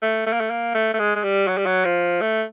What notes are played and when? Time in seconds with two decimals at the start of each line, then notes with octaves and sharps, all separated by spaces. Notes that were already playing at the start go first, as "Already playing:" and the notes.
0.02 A3
0.26 A3
0.33 A#3
0.40 A3
0.51 A#3
0.75 A3
0.94 A3
0.99 G#3
1.16 G#3
1.24 G3
1.48 F#3
1.57 G3
1.66 F#3
1.85 F3
2.21 A3